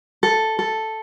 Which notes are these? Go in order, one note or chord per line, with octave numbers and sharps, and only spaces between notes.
A4
A4